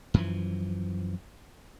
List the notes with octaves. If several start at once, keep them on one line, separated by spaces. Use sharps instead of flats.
F#2 E3 F3